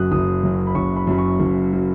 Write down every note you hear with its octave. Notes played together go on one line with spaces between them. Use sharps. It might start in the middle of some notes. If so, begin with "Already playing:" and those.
Already playing: F#1 F#2 F#3 D#6 F#6
F#1 D#6
F#2 F#3
B5
F#1 C#6
B5
F#2 F#3 B5
C#6
F#1
F#3